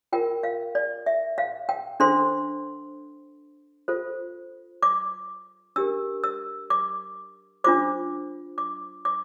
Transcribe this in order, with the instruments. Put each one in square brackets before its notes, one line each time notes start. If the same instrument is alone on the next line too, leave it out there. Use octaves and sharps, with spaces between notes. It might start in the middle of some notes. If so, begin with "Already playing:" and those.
[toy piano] F4 A#4 G5
F5
D5
E5
F5
G5
D4 A4 C5 C6
F4 A4 C5
D6
D4 G4 A#4 E6
E6
D6
D4 F4 C5 D6
D6
D6